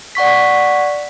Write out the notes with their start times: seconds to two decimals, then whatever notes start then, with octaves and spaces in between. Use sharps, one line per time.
0.15 D5 F#5 C#6 B6